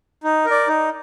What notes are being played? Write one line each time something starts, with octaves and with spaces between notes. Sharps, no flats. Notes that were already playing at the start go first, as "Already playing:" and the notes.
D#4
A#4
D5
D#4